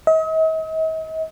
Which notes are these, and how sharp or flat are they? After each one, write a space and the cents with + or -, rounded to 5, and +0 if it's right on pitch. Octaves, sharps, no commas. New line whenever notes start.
D#5 +45